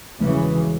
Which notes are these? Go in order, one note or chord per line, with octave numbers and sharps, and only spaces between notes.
E1 C#3 E3